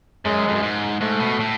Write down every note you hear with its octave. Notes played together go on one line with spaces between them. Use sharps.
F#2 G#3
F2
F#2
G#2
G#2 A3
B2
A2